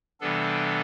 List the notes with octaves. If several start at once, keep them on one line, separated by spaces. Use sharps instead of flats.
C3 E3 G3 B3 D4 A4